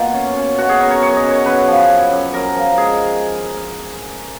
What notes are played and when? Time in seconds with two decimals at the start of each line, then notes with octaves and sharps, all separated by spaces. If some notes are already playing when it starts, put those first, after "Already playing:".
Already playing: B2 A#3 F4
0.14 C#4
0.36 C#4
0.58 B2 F#4
0.69 G#4
0.80 C#4 A#4
0.91 C#5
1.02 F#2 C#5
1.17 D#5
1.24 F#2
1.31 C#5
1.46 F#2 B4
1.68 F3
1.90 F#2
2.11 F#2
2.34 F#2 A#4
2.55 F3
2.77 G#3 G#4
2.99 G#3